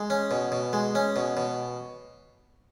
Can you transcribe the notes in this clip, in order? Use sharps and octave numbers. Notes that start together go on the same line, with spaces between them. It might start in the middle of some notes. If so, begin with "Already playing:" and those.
Already playing: G#3
C#4
B2
B2
G#3
C#4
B2
B2